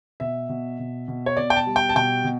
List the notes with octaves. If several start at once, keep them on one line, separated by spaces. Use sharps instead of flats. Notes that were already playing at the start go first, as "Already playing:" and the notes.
B2 E5
B2
B2
B2
C#5
B2 D5
G5
A5
G3
G5
A5
B2 G5
B2